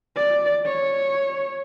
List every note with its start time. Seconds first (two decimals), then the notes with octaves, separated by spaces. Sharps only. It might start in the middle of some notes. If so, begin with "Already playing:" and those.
0.16 D5
0.66 C#5